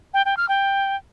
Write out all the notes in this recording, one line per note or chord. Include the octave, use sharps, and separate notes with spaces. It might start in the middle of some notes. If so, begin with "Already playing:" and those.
G5
G5
F6
G5